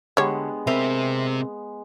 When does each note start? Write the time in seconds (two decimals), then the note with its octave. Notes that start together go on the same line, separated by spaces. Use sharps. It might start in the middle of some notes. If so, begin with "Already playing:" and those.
0.17 D3 G3 G#3 B3 C#5
0.67 C3 C4 A#4 C5 E5